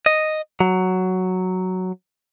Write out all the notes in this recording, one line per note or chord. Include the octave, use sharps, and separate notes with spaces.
D#5
F#3